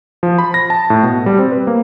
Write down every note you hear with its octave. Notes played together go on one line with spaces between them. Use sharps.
F3
B5
A#6
A5
A2
B2
G3
C4
B4
A#3